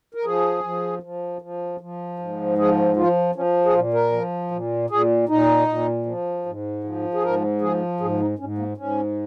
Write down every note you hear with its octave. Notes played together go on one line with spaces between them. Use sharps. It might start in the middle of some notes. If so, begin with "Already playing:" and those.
A#4
F3 G#4
F3
F3
F3
F3
G#2
F3 G#4
F3 F4
F3 C#4
G#4
A#2 F4
A#4
F3
A#2
A#2 G#4
A#2 D#4
A#2
F3
G#2
F3
G#4
G#2 A#4
F3 G#4
G#2 G#4
D#4
G#2 C#4
A#3
G#2 C#4